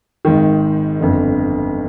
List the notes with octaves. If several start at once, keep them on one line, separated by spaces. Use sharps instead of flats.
G#1 G#2 D#3
G1 F2 D3